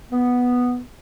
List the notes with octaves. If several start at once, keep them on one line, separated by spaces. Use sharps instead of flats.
B3